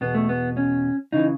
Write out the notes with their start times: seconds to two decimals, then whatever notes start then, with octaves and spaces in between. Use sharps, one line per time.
0.01 E2 B2 B3
0.15 A3
0.29 B3
0.57 C#4
1.12 C#3 E3 D#4